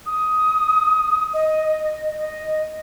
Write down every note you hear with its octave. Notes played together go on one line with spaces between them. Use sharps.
D#6
D#5
D#5